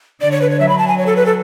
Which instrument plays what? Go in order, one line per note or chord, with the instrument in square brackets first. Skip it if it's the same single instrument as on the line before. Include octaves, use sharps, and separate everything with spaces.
[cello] D3 [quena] D5
[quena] C#5
B4
C#5
[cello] F#3 [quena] E5
[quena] B5
A5
G#5
C#5
A4
B4
A4